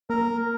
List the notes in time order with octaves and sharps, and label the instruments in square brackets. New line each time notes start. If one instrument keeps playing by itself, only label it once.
[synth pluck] A#3 [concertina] A#4